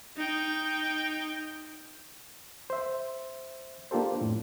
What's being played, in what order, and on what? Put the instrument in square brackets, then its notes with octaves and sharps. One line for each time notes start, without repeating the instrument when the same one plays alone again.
[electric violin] D#4 G5
[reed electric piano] C5 E5
A#3 D4 F4 G4 A4 C5
F2 A2